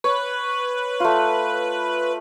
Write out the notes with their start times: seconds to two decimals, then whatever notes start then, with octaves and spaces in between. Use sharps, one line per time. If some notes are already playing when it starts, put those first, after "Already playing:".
0.04 B4 C#5
1.00 A3 F4